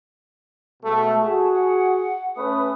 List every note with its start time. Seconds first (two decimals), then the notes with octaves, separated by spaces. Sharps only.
0.83 B2 G#3 A3
1.21 F#4 G#4 A5
1.54 F#5
2.36 A3 C#4 B4 D#6